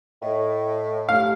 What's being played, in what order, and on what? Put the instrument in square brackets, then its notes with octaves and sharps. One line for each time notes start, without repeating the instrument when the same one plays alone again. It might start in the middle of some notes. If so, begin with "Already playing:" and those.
[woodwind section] A2 [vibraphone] D#5
[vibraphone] A3 G4 [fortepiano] F5